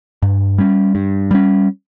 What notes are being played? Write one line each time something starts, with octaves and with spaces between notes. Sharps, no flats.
G2
G3 C#4
G2
G3 C#4